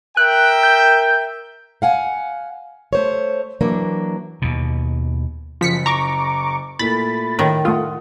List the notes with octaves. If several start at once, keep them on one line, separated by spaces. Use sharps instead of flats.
A#4 E5 G5 F#6
G6
F5 F#5 G#5
A3 C5 C#5
E3 F#3 A#3 D4
D#2 B2
F#1 F3 B6 C#7
A#5 C#6 D6
A#2 A3 E4 B5 A6
A2 D#3
A3 F4 F#5 D#6